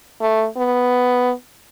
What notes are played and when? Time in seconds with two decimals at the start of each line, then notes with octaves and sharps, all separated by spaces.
0.21 A3
0.57 B3